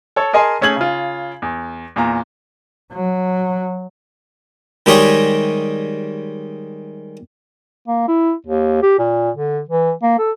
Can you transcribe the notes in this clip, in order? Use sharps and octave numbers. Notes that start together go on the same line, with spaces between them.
A4 C#5
G#4 A#4 D#5 G#5 A5 C6
A3 C#4 G#4 G#6 F#7
C#3 F4
E2
E2 A#2 A#5
F#3
D#3 G3 G#3 G4 G#4 C#5
A#3
E4
D#2
G4
A#2
D3
E3
A#3
A4